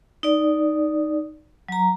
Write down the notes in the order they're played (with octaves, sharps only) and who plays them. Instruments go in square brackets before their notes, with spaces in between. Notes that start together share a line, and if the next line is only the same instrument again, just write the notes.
[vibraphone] D#4 D5
F#3 A#5